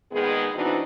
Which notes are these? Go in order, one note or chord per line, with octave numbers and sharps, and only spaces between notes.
A#2 D#3 G#3 B3 G#4
B2 E3 C4 D4 D#4 F#4